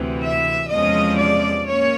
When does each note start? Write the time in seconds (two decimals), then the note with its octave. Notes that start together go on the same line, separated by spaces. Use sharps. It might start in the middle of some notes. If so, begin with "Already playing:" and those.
Already playing: D2 C3 E3
0.22 E5
0.70 E2 C3 F3 G#3 C#4 D#5
1.18 D5
1.67 A#3 C#4 C#5